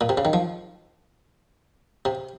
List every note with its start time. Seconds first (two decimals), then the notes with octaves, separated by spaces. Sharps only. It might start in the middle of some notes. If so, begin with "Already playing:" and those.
0.01 A#2
0.09 C3
0.18 C#3
0.25 D#3
0.33 F3
2.05 C3